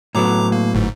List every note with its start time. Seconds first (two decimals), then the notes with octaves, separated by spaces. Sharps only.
0.15 A2 F#3 B3 A#5 D6
0.52 A#3
0.74 G1 G#2